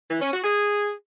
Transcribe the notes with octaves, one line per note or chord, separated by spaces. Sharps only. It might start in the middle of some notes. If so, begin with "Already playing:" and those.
E3
C#4
F#4
G#4